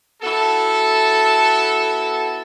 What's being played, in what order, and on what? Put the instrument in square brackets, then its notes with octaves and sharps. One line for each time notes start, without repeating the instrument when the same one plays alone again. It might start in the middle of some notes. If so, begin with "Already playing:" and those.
[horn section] B3 E4 F#4 A4